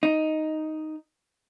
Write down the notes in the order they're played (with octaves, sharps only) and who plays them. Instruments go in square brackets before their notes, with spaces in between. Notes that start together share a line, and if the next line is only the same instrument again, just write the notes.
[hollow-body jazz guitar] D#4